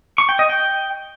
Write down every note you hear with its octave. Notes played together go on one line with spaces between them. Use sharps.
C#6
G5
D#5
G5